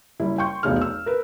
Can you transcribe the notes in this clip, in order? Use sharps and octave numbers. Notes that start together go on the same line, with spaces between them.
F#1 G3 E4
G5 C6 C#6 G6
F1 B1 E2 D#4 G#4 F6
E6
A#4 B4